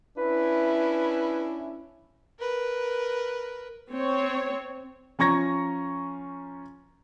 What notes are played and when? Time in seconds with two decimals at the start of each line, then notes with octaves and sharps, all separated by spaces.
0.17 C#4 D4 E4 B4
2.39 A#4 B4
3.92 C4 C#5
5.19 F3 C#4 A#5 C#6 G#6 A#6